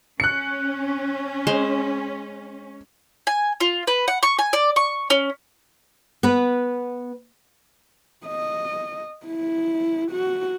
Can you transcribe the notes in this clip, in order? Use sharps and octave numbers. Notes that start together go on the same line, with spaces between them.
C#4 F#6 C#7
G#3 C5
G#5
F4
B4
F#5
C#6
G#5
D5
C#6
C#4
B3 B4
D#5
E4
F#4